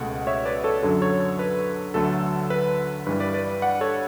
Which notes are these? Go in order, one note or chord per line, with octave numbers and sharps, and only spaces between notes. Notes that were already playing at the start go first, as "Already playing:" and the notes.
Already playing: C#2 B2 A3 F#5
C#5 E5
B4 D5
A4 C#5
F#2 D3 F#3 A4
A4 C#5
B4
D2 D3 F#3 A3 A4
B4
G2 E3 G3 B4
B4 D5
B4 D5
D5 F#5
A4 C#5